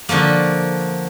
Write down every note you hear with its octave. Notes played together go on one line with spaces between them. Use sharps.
D3 F3 A3 A#3